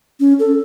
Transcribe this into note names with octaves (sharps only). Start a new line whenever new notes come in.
C#4
A4